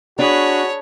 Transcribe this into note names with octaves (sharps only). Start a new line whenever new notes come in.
D4 F#4 G#4 C#5 B5